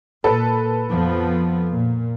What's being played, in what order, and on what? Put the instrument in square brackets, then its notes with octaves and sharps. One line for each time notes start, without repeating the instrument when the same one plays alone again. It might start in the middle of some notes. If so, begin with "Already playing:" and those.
[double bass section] A#2 [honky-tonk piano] A4 B4
[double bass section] F2 F3 B3
A#2